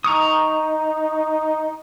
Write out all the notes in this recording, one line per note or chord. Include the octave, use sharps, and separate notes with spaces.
D#4 A#5 C#6 D#6